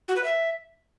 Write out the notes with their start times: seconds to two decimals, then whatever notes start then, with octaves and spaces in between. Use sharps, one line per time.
0.08 F#4
0.16 B4
0.24 E5